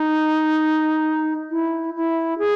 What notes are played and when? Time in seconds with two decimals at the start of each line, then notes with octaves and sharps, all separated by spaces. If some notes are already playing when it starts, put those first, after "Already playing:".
Already playing: D#4
1.51 E4
1.95 E4
2.39 G#4